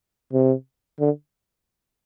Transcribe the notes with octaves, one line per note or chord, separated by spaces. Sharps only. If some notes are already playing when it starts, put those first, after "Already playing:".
C3
D3